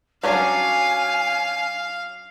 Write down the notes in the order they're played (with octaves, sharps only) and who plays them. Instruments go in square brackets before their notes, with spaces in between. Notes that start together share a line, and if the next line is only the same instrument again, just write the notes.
[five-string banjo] F#3 C#4 D4 [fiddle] F5 [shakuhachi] G#5